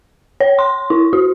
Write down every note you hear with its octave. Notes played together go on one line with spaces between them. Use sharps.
C#5
C6
E4
F#4